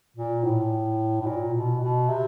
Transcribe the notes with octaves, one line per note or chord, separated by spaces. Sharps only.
A#2
A2
A2
A#2
B2
B2
C3